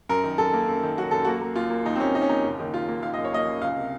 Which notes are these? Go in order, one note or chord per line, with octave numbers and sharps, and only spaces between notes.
F#2 A#4
D#3
F#2 A4
A#3
F#2
D#3
F#3 F#4
F#2 A4
A#3 F#4
A#3
D#2 F4
A#3
D#2 D#4
C4
D#2 C#4
D#2 D#4
C#4
D#2 D#4
F#1
D#3
D#3 F4
A#3
D#3 F5
F#2 D#5
C#5
A#3 D#5
F#2
C#2 F5
C3